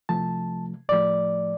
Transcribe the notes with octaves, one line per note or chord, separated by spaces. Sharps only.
C2 C3 F3 A3 A5
A2 F3 A3 D5